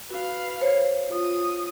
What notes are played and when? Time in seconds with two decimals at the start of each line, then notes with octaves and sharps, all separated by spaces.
0.11 F#4 B4 F5
0.61 C5 C#5
1.09 F4 D#6